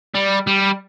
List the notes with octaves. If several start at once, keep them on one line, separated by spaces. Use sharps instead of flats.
G3
G3